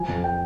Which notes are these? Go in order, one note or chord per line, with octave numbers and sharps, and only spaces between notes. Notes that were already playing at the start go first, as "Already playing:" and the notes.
Already playing: F3 G#5
F2
G5